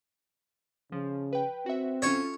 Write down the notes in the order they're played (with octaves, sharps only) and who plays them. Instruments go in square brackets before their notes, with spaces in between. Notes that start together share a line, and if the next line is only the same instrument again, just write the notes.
[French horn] C#3 [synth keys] F3
[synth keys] B4 G5
[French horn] C4 [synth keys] F#4 E5
[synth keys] C#4 F4 A4 [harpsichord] C#5